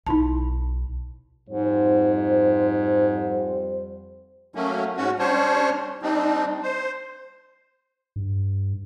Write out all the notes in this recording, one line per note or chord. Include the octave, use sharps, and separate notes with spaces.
B1 D#4 E4 A5
F2 G#2 G3 C5
F#3 A3 A#3 C#4
G#2 C#4 F#4
G3 C#4 D4 C5 C#5
G3 C4 D4 D#4
C5
G2